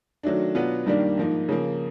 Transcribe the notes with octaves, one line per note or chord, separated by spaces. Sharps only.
D#3 F#3 A3 D4
B2 F#3 B3 D4 F4
G2 D#3 G3 A#3 D4
G#2 F3 A#3 D#4
C#3 F3 A#3